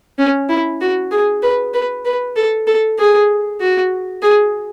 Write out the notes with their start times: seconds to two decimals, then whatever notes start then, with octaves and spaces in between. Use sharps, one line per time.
0.19 C#4
0.49 E4
0.81 F#4
1.11 G#4
1.43 B4
1.74 B4
2.05 B4
2.36 A4
2.67 A4
2.99 G#4
3.60 F#4
4.22 G#4